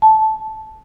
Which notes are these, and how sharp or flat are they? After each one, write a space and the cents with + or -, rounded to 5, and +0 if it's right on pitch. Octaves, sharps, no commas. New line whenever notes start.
A5 -10